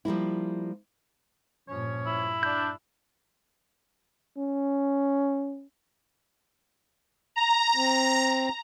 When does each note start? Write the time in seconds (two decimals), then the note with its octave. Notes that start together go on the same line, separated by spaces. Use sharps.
0.05 F3 G3 A#3 E4
1.69 G2 A#2 F3 C#4 C#5
2.07 G2 E4
2.43 D4 G6
4.37 C#4
7.36 A#5
7.76 C4